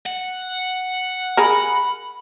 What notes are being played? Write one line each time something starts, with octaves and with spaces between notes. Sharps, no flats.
F#5
G#4 A#4 B5